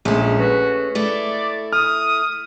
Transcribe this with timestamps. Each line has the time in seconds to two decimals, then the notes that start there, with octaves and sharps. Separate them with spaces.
0.05 A#1 G#3 A3 C#4
0.38 F#4 G#4 B4
0.95 A3 E4 D5
1.73 D#6 F6